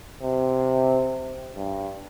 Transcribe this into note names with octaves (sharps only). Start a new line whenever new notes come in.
C3
G2